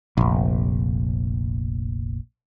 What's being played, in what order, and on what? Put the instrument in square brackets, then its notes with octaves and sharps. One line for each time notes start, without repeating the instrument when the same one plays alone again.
[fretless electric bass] F1 A#1